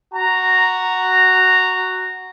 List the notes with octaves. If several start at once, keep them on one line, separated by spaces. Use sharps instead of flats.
F#4 A#5